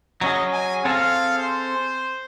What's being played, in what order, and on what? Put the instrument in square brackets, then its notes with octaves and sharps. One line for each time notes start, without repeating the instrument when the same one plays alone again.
[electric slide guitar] F#3 C#4 G#4 [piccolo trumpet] D#5
[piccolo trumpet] G#5
[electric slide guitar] C4 G#4 A4 [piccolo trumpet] F5
[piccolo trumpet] C5